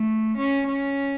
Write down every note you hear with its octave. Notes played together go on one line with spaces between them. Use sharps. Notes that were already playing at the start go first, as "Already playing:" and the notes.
Already playing: A3
C#4
C#4